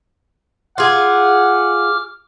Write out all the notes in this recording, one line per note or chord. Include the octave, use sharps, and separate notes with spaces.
F4 G#4 F#5 D6 F6